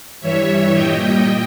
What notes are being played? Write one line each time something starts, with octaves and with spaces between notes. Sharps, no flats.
G2 E3 G3 C#5 E5
A#2 G3 D#5 G5